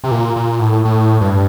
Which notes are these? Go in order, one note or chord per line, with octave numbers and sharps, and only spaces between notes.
C3
A#2
A#2
A2
A2
G2